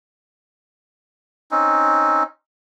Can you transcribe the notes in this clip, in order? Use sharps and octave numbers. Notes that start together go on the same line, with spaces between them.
C4 C#4 D#4